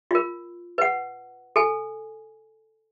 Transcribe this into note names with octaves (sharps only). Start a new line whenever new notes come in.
F4 A#4
B4 F#5
A4 G#5